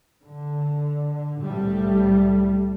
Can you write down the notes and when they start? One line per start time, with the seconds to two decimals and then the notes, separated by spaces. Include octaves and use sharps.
0.24 D3
1.42 C2 A2 G3 A3